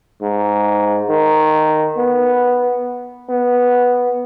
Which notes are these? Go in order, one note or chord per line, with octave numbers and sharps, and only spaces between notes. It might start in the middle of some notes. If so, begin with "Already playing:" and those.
G#2
D#3
B3
B3